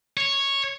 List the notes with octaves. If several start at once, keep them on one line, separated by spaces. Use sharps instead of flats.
C#5